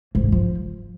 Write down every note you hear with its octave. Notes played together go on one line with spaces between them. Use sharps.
G#2
D3
F3